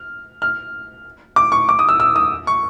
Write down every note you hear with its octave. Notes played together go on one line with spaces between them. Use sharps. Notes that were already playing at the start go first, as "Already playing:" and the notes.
Already playing: F6
F6
D6
C#6
D6
D#6
E6
E6
D#6
C#6